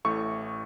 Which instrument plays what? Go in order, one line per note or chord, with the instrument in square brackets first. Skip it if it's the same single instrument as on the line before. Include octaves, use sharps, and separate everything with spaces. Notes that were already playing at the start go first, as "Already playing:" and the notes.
[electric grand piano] A1 A2 A3 C#6